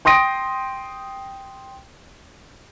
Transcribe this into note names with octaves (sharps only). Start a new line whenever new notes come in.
G5 C6 D#6 A#6 D7